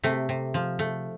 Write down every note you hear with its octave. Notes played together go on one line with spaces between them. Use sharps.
C3 A3
C3
F3
A3